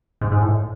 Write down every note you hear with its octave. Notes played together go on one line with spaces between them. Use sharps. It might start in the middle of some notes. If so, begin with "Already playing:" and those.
G#2
G#2
A2